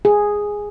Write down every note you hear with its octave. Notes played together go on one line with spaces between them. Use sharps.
G#4